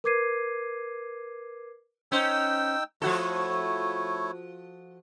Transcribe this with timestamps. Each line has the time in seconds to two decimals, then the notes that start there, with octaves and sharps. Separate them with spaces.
0.04 A#4 B4 D6 G#6 C7 D#7
2.12 C#4 D#4 C5 G5 E6
3.02 F3 A3 E4 F#4 A4 C#5